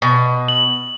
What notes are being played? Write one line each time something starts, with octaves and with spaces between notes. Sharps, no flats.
B2
F#7